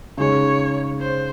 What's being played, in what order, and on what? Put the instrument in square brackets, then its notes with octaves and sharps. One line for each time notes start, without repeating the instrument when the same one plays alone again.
[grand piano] C#3 G#3 D#4 [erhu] C#5
[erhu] C5